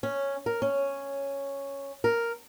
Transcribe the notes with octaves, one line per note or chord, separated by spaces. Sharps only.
C#4
A#4
C#4
A#4